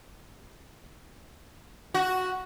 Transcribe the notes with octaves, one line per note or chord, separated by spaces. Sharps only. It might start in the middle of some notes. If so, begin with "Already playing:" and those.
F#4